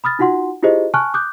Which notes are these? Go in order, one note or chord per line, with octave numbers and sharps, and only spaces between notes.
B5 D#6 F6 A6
D#4 F4 F#4 F#5 C6
E4 F4 G4 G#4 C5 D#5
G#5 A5 C#6 F6 F#6
D6 D#6 F#6 G6